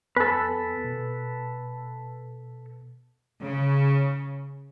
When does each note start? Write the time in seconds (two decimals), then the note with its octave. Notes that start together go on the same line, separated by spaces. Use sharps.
0.16 F2 B3 A4 B4 G#5
0.85 B2
3.43 C#3